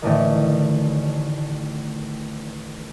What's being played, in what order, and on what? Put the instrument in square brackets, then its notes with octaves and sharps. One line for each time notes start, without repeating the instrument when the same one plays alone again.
[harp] A1 A2 D3 D#3